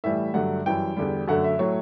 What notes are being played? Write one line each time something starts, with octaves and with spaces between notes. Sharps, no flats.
A2 E3 G3 E5
G2 D3 F#3 A3 F#5
F#2 E3 G3 G5
E2 D3 G3
F#2 D3 A3 F#5
E5
A2 F#3 A3 C#5